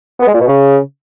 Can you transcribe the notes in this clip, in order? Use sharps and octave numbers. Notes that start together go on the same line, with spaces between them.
B3
G#3
A#2
B2
C#3